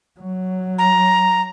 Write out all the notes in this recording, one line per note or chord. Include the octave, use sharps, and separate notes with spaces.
F#3
A#5